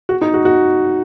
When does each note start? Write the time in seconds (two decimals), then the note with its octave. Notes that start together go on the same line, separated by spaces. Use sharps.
0.09 F#4
0.22 D#4
0.34 F#4
0.45 F#4